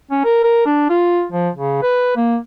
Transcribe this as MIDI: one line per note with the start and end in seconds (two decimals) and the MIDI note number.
0.11 0.21 61
0.25 0.43 70
0.44 0.65 70
0.65 0.89 62
0.89 1.25 65
1.32 1.49 53
1.55 1.82 49
1.82 2.13 71
2.16 2.37 58